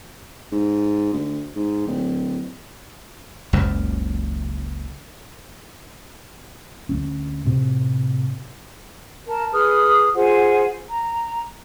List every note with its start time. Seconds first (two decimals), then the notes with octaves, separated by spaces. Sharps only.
0.52 G#2
1.13 D2
1.56 G#2
1.87 D1
3.53 F#1 C#2 F#2
6.89 D2 G#3 C#4
7.45 A2 C3 C4
9.27 A#4 A5
9.52 G#4 B4 D#6 F6
10.15 F4 G#4 C5 F#5
10.90 A#5